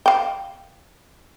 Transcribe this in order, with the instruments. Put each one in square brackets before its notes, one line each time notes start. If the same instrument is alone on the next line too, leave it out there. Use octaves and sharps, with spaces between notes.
[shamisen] F5 G5